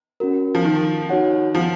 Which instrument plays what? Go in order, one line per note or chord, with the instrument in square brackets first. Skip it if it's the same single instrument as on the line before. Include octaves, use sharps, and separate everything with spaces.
[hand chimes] C#4 F#4 A#4
[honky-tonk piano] F3
D#3
[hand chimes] D#4 F#4 C#5 F#5
[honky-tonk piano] F3